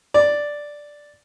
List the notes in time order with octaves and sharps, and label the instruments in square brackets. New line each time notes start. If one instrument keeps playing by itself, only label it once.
[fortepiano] D5